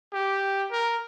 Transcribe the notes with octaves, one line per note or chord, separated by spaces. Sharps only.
G4
A#4